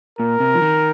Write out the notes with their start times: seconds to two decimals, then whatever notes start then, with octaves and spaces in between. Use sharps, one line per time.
0.19 A#2 A#4
0.40 C3
0.54 F3
0.62 D#3